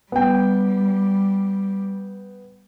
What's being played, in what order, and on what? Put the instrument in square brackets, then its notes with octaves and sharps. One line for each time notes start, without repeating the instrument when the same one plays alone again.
[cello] G3 [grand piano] B3 G5